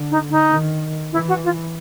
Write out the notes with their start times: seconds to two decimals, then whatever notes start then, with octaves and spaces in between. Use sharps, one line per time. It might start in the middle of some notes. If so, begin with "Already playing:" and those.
Already playing: D3
0.11 D#4
0.31 D#4
0.51 D#3
1.12 E3 E4
1.28 F#4
1.44 F4